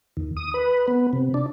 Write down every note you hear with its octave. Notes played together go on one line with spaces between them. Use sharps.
D#2
D#6
B4
B3
C3
D4